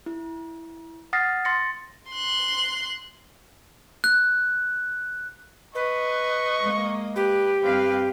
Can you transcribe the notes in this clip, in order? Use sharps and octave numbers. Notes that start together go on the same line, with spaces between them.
E4
F#5 D#6 F6 A6 A#6 C7
C6 A6 A#6 C#7
C6 F#6
F#6
B4 D#5 C#6
G#3 A#3
G4 B4
G2 C4 B4 F5